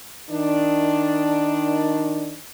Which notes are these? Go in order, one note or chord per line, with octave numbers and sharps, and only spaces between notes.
D#3 D4